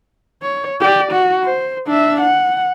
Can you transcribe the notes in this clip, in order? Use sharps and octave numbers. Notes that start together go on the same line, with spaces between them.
C#5
G4 D5
F#4
C5
D4 E5
F#5